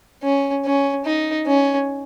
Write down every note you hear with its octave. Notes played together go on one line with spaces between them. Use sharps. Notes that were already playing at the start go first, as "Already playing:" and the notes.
C#4
C#4
D#4
C#4